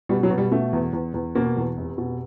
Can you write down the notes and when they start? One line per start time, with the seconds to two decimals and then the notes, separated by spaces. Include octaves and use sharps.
0.09 B2 G3
0.23 F#3
0.30 B2
0.38 G3
0.51 B2 A3
0.73 E2
0.93 E2
1.14 E2
1.35 B2 A#3
1.57 E2
1.77 F1
1.98 B2